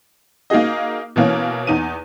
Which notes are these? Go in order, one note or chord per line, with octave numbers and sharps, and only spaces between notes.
A#3 D#4 F#4 G#4 D#5
B2 E3 A#3 C#4
E2 D#4 D#7